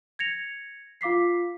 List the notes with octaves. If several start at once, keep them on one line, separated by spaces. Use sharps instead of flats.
G#6 A#6 C#7 F7
F4 F5 D6 B6 C7